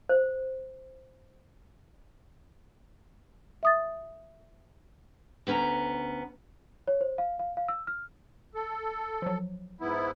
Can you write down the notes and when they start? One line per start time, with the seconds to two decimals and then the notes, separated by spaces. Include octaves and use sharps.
0.09 C5
3.63 E5 D#6 A6
5.47 D2 B3 C#4 A5 A#5
6.88 C#5
7.01 C5
7.18 F5
7.39 F5
7.57 F5
7.68 E6
7.87 F6
8.55 A4
9.22 F3 F#3
9.81 G#2 B3 E4